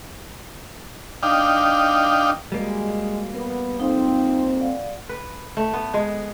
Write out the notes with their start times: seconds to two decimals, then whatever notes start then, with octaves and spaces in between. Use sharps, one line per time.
1.23 D4 D#4 F5 G5
2.52 G3 G#3 A#3 F#4
3.34 B3 A#4
3.80 F2 C4 D#4 F5
4.60 D5 F5 F#5
5.09 B4
5.57 A3
5.73 B3
5.94 G#3